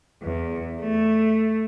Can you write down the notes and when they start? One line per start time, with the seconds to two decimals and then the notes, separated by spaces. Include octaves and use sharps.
0.22 E2
0.81 A3